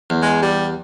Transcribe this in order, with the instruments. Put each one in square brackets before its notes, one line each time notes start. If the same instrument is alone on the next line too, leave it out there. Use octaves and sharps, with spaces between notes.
[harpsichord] E2
[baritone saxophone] G#3
G3